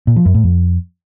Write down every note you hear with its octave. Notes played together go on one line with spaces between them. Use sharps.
A#2
F3
F#2
A2
F2